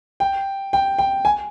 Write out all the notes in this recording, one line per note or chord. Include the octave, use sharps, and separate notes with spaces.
G5
G5
G5
G#5